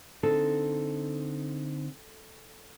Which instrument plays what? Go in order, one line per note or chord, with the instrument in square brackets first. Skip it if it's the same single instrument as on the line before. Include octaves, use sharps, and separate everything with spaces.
[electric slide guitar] D3 C4 D#4 [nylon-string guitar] A4